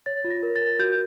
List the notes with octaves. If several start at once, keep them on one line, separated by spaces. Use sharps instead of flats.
C#5 A6
F4
A#6
A#4
A6
A#4
F#4 G6